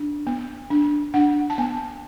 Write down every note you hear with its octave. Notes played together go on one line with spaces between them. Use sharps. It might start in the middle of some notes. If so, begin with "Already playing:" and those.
Already playing: D4
B3
D4
D4 F#5
A5
B3 G#5